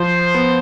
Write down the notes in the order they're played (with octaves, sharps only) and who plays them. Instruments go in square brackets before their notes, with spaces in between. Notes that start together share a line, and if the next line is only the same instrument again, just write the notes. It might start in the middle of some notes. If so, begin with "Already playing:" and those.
Already playing: [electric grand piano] F3 [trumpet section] C5
[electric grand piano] B3